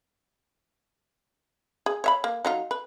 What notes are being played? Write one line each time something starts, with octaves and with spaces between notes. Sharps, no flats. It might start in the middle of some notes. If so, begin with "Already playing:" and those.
G#4
C#5 E5 B5
A#3
F#3 D#4 F4
B4